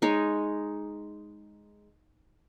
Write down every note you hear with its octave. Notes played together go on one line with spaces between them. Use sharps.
G#3 D#4 C#5